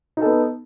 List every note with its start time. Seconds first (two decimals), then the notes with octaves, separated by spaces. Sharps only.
0.17 D#4
0.21 A4
0.26 B3